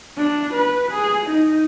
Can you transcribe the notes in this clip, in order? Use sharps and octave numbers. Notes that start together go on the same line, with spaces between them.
D4
B4
G#4
D#4